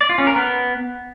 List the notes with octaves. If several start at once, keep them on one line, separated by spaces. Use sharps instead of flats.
D5
F4
C#4
A#4
B3